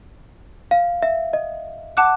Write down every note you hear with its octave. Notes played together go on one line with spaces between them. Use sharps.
F5
E5
D#5
F#5 A5 D6 F#6